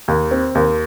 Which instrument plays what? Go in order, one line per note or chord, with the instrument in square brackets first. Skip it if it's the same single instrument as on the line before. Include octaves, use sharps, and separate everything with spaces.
[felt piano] D#2
C4
D#2